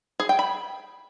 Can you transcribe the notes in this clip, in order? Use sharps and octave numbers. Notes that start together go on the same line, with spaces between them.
G#4
G5
B5